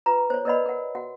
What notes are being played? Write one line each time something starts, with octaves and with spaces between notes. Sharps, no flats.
F4 B4 A#5
C5 C#5
A#4 B4 D5 D#5 F#5 B5
A#4 F#5
F#4 F#5